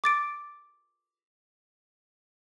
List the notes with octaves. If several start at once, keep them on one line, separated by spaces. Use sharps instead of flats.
D6 A6 D7